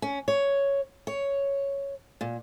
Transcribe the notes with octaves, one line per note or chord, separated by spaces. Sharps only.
C#4
C#5
C#5
A#2